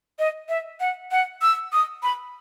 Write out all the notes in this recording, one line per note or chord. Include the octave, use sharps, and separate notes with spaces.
D#5
E5
F#5
F#5
E6
D#6
B5